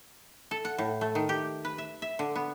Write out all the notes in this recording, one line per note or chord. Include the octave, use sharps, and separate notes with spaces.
A4
F#5
A2
A3
D#3
G4
B4
E5
E5
D3
B3